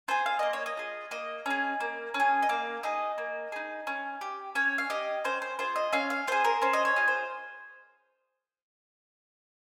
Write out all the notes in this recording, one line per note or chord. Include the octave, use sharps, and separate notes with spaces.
F4 G#4 C5
F5
A#3 D#5
C#5
D#5
F4 G#4
A#3 D#5
C#4 G#4
A#3
C#4
G#4
D#5
A#3 F5
D#4 G#4 D#5
A#3
D#4 G#4
C#4
G4
C#4 C#5
F5
G4 D#5
C#4 C5
C5
F4 G#4 C5
D#5
C#4 F5
F5
F4 G#4 C5
A#4
C#4 C5
D#5
C#5
F4 G#4
C5